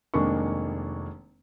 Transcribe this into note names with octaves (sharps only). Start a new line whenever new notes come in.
F1 D#3 G#3 A#3 D4 C#6